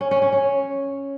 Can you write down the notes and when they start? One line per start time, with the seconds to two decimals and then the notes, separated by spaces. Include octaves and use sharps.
0.01 C#4
0.11 C#4
0.22 C#4
0.32 C#4